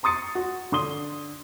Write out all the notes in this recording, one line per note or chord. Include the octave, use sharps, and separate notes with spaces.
A#5 C6 D#6 A6 C#7
F#4
D3 C6 D#6 G7